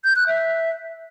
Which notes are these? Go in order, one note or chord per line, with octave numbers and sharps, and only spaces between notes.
G6
F#6
E5